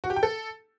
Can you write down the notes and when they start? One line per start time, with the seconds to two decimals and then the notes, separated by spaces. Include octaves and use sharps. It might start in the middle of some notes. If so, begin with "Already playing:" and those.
0.04 F#4
0.10 G4
0.16 G5
0.23 A4